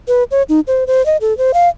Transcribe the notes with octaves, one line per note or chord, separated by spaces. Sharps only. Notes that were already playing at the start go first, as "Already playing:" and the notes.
B4
C#5
D#4
C5
C5
D#5
A4
C5
F5